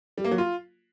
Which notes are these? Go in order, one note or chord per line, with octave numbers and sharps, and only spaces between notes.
G3
A#3
F#3
F4